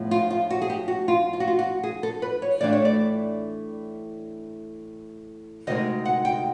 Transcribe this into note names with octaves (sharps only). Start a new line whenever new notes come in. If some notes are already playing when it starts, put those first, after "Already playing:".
Already playing: A2 F3 G#3 B3
F4
F4
F#4
G#4
G4
F#4
F4
F4
F#4
F4
F#4
G#4
A4
B4
C#5
A2 E3 A3 D4 F4 D5
C#5
D5
D2 C3 D#3 G#3 D#5
F#5
G5